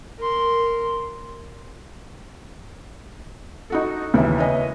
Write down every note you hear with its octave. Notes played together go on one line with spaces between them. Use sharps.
A#4 C6
D#4 F#4 A4
D#2 C#3 E3 E4 B4
B4 C#5 D#5 G#5